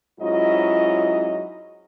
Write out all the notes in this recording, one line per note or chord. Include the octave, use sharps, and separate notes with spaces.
G#2 F#3 C#4 E4 F4 D#5